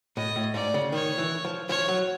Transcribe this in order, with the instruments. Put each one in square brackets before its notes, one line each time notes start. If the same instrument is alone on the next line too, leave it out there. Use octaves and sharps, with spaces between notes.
[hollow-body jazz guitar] A2 [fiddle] D#5
[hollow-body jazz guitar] A2
[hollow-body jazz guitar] G#2 [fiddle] D5
[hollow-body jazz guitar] C#3
[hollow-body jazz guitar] D#3 [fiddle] C#5
[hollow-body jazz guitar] E3
F3
[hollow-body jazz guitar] F3 [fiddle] C#5
[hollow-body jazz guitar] F#3